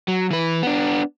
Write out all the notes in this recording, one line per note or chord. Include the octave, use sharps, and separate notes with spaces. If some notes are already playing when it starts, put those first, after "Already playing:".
F#3
E3 B4
B3 D4